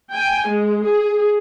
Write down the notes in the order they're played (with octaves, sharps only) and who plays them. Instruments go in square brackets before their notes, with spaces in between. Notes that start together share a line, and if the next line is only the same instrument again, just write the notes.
[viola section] G5 G#5
G#3
G#4